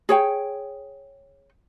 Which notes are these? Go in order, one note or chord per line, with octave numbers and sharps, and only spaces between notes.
G#4 C#5 G5